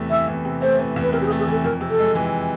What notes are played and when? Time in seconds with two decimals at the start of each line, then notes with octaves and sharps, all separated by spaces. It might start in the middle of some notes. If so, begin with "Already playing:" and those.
Already playing: E2 C3 A3
0.10 E3 E5
0.28 E2
0.45 C3
0.62 A3 C5
0.79 E3
0.96 E2
1.03 B4
1.12 C3 A#4
1.21 G4
1.26 G#4
1.31 A3
1.39 G#4
1.48 E3 A4
1.64 F2 A#4
1.81 C3
1.90 A4
1.99 G#3
2.15 E3